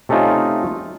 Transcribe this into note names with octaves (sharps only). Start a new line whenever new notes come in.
C3 A3 C#4 D#4 F4